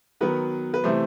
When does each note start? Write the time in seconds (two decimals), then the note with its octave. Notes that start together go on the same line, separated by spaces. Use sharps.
0.21 D#3 F#3 B3 B4
0.74 B4
0.84 C3 E3 A3 C5